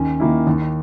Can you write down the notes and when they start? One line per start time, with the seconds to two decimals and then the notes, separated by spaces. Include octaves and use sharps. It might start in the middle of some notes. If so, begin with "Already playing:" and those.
Already playing: D#2 C#4
0.20 D#3 A#3 E4
0.47 D#2